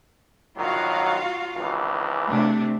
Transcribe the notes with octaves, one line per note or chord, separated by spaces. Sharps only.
A#1 D#3 F#3 F4 F#4 F5
G#1 C#2 E3
C3 A3 D4